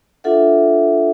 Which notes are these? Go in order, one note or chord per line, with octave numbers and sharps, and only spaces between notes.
D4 F4 A4 E5 F#5